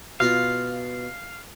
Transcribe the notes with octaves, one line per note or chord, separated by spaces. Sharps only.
B2 F4 F5